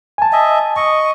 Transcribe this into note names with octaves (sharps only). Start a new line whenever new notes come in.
G#5 A5
D#5 E5
D#5 C#6